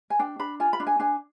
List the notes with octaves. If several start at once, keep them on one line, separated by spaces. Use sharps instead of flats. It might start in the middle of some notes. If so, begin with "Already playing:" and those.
G#5
D4 G5
D4 B5
F4 G#5
B5
D4
G#5
D4 G#5